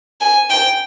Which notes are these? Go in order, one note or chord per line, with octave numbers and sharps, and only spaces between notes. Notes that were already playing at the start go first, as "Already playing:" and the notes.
G#5
G5